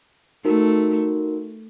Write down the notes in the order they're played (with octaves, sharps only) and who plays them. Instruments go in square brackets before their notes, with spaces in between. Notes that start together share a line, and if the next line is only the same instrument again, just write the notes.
[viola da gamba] A3 [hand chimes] D#4 F#4 A#4